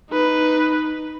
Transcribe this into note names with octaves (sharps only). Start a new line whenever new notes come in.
D#4 B4